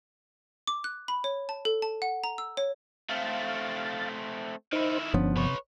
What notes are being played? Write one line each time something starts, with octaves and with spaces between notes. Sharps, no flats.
D6
F#6
B5
C#5
A5
A4
A5
F#5
A#5
E6
C#5
A3 C4 F5 A6
D#3 D#4 E4 C5
G1 D3 F3 B3 C#4
C3 B4 C#5